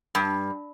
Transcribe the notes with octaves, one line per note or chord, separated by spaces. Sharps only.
G2